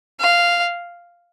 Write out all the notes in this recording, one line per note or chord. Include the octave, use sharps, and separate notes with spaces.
F5